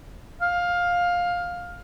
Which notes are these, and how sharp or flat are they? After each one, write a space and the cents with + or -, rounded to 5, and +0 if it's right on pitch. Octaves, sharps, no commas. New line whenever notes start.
F5 +15